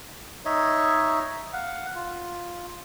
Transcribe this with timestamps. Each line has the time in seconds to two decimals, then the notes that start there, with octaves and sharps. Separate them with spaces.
0.45 D#4 C#5 D#5 E5
1.53 F5 F#5
1.95 F4